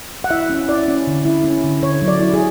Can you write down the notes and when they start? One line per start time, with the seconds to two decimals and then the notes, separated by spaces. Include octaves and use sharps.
0.24 F#5
0.30 E4 E5
0.50 C#4
0.68 E4 D5
0.88 C#4
1.07 D3
1.25 E4
1.44 C#4
1.64 D3
1.83 D3 C#5
2.02 F#3
2.08 D5
2.20 E4
2.34 G#4